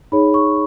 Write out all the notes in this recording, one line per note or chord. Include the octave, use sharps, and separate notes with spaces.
D#4 G#4 C#5 B5
C#6